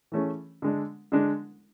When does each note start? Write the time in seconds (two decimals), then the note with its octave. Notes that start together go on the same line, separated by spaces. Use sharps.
0.12 E3 A3 C#4 G#4
0.62 D3 G#3 D4
1.12 D3 G#3 D4